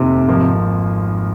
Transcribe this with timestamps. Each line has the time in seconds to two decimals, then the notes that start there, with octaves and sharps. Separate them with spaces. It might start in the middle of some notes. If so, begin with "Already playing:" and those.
Already playing: F1 D#2 C3 D#3
0.28 G#1 G#2 F3 A#3